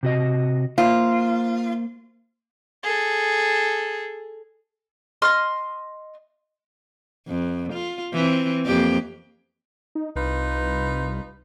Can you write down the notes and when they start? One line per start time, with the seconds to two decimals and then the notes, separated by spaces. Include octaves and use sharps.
0.03 C3 F#4 D#5
0.78 A#3 F4 C5
2.83 G#4 A4
5.22 D#5 C6 F6
7.28 F2
7.73 F4
8.13 E3 C4
8.66 F2 A#3 G4
9.95 D#4
10.16 C2 D#4 F4 B4